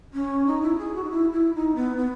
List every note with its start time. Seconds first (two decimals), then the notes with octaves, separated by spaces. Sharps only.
0.13 C#4
0.47 D#4
0.62 E4
0.78 G#4
0.95 F#4
1.04 D#4
1.11 E4
1.32 E4
1.55 D#4
1.75 B3
1.97 B3